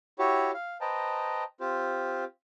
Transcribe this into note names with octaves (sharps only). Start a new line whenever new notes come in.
E4 F#4 G4 C#5
F5
B4 C5 D#5 G5 A5 A#5
C4 F4 G4 C5